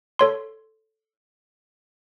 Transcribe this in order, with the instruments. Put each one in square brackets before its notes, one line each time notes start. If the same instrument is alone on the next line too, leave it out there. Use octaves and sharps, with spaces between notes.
[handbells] A4 C#5 C6